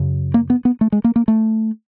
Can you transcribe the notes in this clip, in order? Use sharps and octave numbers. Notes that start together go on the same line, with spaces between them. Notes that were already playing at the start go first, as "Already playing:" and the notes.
Already playing: F#2 C#3
A#3
B3
B3
A3
G#3
A#3
A#3
A3